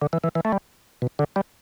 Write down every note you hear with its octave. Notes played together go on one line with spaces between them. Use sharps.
D3
E3
E3
E3
A3
G3
B2
D3
G3